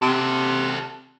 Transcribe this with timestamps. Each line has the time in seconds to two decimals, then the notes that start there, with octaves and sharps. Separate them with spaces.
0.02 C3 F#4 A4